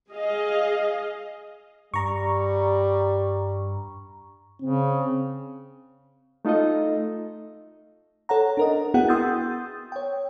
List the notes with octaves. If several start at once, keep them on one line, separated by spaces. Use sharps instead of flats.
G#4 D#5 F5
G2 G3 A#5 C#6
C#3 C4
A3 D#4 F4 A4 D#5
A4 C#5 F#5 A#5
D4 A#4 D#5
B3 E4 F#4 G#4 F#5 G5
C6 D#6 E6 G6 A6
C#5 G5